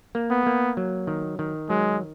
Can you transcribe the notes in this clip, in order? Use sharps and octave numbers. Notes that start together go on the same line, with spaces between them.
A#3
B3
A#3
F#3
D#3
D#3
F#3 G#3